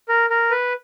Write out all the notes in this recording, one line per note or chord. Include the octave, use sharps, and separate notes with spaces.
A#4
A#4
B4